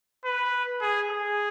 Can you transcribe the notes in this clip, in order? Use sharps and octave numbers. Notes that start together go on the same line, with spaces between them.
B4
G#4
G#4